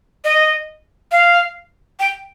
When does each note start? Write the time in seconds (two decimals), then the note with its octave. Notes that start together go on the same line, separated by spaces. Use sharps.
0.25 D#5
1.12 F5
2.00 G5